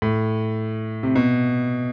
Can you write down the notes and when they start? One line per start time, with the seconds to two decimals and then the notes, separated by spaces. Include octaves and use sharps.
0.02 A2
1.03 C3
1.15 B2